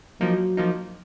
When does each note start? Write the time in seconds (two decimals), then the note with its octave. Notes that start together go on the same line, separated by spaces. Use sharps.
0.21 F3 F#3 A#3 D#4
0.57 F3 A#3 D#4